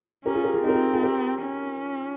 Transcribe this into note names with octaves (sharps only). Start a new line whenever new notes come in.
C#4 G4 A#4
F4 G#4
G4 A#4
F4 G#4
C4 D#4 G4
A#4
F4 G#4
F4 G#4
G4 A#4
C#4